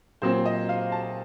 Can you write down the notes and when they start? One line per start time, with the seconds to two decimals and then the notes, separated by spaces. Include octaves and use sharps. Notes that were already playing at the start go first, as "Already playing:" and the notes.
0.22 A#2 F#3 C4 C5
0.46 D#5
0.69 F5
0.92 A5